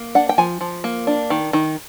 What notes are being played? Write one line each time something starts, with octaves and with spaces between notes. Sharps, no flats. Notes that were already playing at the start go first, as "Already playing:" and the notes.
Already playing: A#3
D4 F#5
G5
F3 G#5
F3
A#3
D4
D#3
D#3